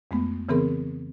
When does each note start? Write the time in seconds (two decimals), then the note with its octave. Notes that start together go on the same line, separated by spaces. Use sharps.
0.11 F2 G#3 A3 B3
0.49 C#3 E3 B3 C4 G#4 A#4